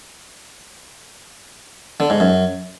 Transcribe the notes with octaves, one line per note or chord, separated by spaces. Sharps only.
D3
G#2
F#2